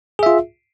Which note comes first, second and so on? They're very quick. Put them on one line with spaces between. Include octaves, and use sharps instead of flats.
G#4 E5 F4